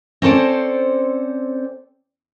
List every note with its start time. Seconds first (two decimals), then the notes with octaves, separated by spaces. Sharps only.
0.22 C4 C#4 A4 C5 D5